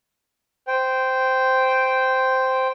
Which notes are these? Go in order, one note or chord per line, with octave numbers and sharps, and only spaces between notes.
C5 G5